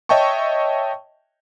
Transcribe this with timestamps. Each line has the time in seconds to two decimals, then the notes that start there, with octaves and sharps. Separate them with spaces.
0.09 C#5 D#5 E5 G5 A5 C#6